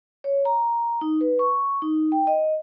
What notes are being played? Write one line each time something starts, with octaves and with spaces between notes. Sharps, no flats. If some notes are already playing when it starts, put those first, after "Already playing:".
C#5
A#5
D#4
B4
C#6
D#4
G5
D#5